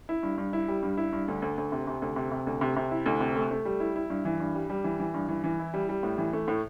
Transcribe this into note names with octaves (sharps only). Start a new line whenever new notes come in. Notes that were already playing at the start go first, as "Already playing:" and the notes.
E4
G2
G2
E4
G3
G2
E4
G2
D2
D2
D2
C3
C3
D2
C3
C3
D2
C3
C3
E4
D2
C3
A3
A3
G3
E4
E4
G2
E3
G2
G3
G3
E3
E3
G2
E3
E3
E4
G3
G3
A2
E3
A3
A2